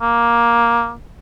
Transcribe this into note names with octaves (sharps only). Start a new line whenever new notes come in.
A#3